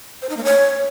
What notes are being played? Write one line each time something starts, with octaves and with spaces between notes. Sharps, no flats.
C5
D#4
A#3
C#5